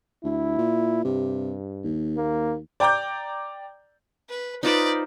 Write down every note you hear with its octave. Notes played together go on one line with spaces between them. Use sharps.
D2 E4
A#2
G2 C3
D#2
A#3
D5 G5 A#5 D6 G6
B4
D#4 F4 B4 C5 D5